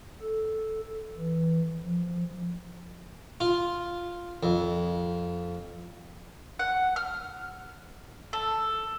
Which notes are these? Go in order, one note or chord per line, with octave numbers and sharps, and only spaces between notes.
A4
E3
F3
F4
F2
F#5
F6
A4